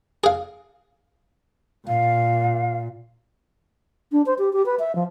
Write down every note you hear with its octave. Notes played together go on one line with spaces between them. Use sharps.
G#4 F5
A#2 F5
D4
C5
G4
G4
B4
E5
F3